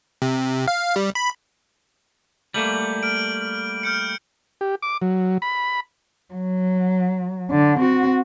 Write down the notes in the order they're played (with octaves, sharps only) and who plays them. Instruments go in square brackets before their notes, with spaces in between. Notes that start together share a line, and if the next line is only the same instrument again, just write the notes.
[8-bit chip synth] C3
F5
G3
B5
[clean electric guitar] G3 A3 A#3 [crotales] F#7
[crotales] F6 D7
F6 G6 C#7
[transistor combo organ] G4
D6
F#3
B5
[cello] F#3
D3
C4 F#4